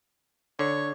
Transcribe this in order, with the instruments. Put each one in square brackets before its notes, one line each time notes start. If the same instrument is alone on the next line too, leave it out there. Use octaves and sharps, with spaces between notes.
[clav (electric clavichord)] D3 [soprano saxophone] C#5